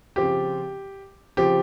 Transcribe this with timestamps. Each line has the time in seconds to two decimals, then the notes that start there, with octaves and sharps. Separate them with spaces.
0.16 C#3 F3 C4 F4 G4
1.37 C#3 F3 C4 F4 G4